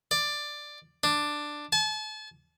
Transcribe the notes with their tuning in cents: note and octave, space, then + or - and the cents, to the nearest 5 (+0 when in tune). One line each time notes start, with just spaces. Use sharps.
D5 +10
D4 +10
A5 -40